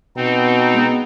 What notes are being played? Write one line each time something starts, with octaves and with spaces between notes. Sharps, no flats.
B2 C4 D#4
G#3 B3